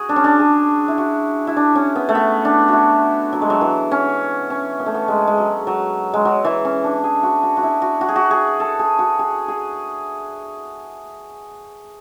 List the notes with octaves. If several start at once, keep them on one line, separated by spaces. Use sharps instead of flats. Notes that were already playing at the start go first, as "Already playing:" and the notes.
Already playing: F#4 G#4
D4
C#4
D4
G#4
E4
F#4
E4
D4
C#4
B3
A3
B3
D4
E4 F#4
F#3
G#3
F#3
E3
C#4
C#4
B3
A3
B3
G#3
G#3
F#3
F#3
G#3
F#3
E3
C#4
D4
G#4
F#4
F#4
F#4
E4
F#4
F#4
G#4
F#4
G#4
A4
G#4
F#4
G#4
G#4